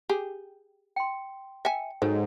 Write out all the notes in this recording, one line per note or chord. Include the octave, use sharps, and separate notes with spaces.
G4 G#4
G5 C6
E5 G5 G#5
G#2 F#3 A4 C#5 G#5